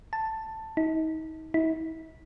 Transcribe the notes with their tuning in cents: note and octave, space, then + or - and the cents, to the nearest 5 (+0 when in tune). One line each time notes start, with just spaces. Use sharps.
A5 +5
D#4 +35
E4 -45